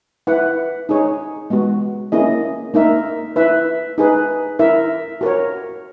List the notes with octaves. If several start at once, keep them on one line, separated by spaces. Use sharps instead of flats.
E4 B4 F#5
D#4 G#4 C#5
G#3 B3 F#4
A#3 C#4 E4 G#4 D#5
A#3 D#4 A#4 E5
E4 B4 E5
D#4 G#4 B4
E4 A#4 E5
F#4 A#4 C#5